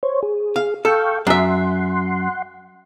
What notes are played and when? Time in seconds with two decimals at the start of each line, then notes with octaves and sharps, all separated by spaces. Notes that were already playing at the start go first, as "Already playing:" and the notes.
0.03 C5 C#5
0.23 G#4
0.56 F5
0.85 A4 F5 G5 C#6
1.27 F#2 E5 F#5 C6